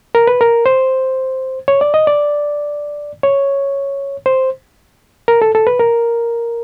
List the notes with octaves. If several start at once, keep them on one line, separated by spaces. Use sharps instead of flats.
A#4
B4
A#4
C5
C#5
D5
D#5
D5
C#5
C5
A#4
A4
A4
B4
A#4